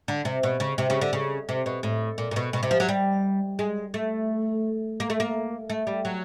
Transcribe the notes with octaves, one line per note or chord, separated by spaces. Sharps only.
D3
C3
B2
C#3
C3
C#3
D3
C#3
C3
B2
A2
A#2
A#2
B2
B2
C3
F3
F#3
G3
G#3
A3
A#3
A3
A#3
A3
G3
F#3